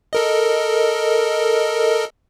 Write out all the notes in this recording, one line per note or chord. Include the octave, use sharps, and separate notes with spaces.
A4 A#4 D#5